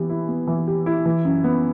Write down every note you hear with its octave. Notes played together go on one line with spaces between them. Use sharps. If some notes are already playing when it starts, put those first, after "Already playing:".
Already playing: E3 B3 G4
E4
B3
E3
G4
E4
E3
F#2
B3